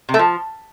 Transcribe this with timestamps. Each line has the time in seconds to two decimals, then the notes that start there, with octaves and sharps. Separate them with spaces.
0.09 C3
0.14 A3
0.19 F3